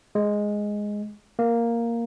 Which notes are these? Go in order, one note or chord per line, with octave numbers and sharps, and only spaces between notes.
G#3
A#3